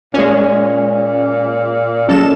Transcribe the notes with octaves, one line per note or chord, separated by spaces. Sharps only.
A#2 G#3 C#4
F#3 G#3 C#4 A4 E7